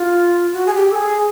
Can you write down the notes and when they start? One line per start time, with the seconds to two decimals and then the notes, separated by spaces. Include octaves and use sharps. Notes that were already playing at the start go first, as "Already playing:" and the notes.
Already playing: F4
0.53 F#4
0.67 G#4
0.74 G4
0.91 A4
0.96 G#4